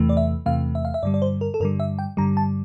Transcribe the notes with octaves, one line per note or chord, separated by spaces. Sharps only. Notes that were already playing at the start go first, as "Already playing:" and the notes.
Already playing: E2 C3 E3 A3
D5
E5
E2 C3 E3 A3 F5
E5
F5
E5
G2 D3 G3 D5
D5
C5
A#4
A4
G2 D3 G3 A#4
E5
G5
G2 D3 G3 A#5
A5